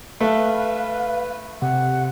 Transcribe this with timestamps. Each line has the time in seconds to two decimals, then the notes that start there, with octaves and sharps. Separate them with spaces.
0.21 A3 B4 F5
1.62 C3 F#5